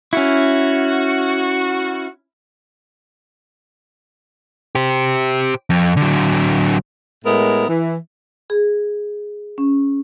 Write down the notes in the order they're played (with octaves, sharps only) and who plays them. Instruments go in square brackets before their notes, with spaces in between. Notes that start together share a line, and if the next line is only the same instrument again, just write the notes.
[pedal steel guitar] C#4 E4 [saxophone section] F#4
[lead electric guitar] G4 C5
F2
D3 F#3
[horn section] A2 G#3 B3 E4 A#4
E3
[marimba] G#4
C#4